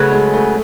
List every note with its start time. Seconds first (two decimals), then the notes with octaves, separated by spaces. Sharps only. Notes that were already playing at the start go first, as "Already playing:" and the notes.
Already playing: C#3 F#3 A3 B3
0.11 G#3
0.34 A3